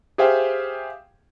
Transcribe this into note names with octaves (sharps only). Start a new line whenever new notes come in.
G4 G#4 C5 E5 F5 G5